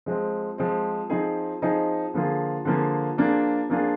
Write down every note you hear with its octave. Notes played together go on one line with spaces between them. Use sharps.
F3 G#3 C4
F3 G#3 C4
F3 C4 D#4 G#4
F3 C4 D#4 G#4
D3 F3 A#3 F4 G#4
D3 F3 A#3 F4 G#4
F3 A#3 D4 F4 G#4
F3 A#3 D4 F4 G#4